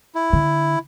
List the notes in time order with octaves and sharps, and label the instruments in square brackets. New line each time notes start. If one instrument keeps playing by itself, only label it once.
[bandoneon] E4
[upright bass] D3